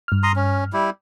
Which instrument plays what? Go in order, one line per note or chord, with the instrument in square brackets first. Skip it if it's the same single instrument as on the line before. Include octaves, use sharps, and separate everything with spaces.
[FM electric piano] G2 F6
[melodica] A#5 C6 D#6
C#4
G3 E4